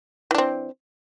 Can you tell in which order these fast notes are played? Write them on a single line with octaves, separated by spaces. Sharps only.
E3 D4 C4